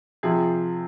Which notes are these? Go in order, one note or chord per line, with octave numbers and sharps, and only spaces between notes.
C3 F3 G#4